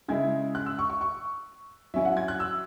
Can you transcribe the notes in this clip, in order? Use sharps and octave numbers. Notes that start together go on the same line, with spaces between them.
C#3 G#3 E4 G#6
F#6
E6
C#6
C#6
C#6
F#3 C#4 E4 E5
F#5
G#6
F#6
E6